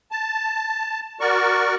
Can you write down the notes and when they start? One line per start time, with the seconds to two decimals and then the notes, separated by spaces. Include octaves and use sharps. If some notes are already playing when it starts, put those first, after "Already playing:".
0.11 A5
1.20 F#4 A#4 D5 C#6